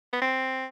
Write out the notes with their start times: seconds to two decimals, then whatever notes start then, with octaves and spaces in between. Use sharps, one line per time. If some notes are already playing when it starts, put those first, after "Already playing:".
0.13 B3
0.22 C4